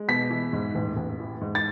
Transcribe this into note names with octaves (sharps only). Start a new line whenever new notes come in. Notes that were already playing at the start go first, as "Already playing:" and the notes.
Already playing: G#3
B2 B6
E3
G#2
A1
A1
E3
G#2
A6